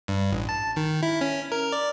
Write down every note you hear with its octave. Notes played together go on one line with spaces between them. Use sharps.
G2
A1
A5
D#3
E4
C#4
A#4
D5